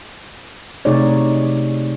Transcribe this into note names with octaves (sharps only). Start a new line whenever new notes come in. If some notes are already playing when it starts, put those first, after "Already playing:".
C3 A3 D#4 G#4 C#5 D5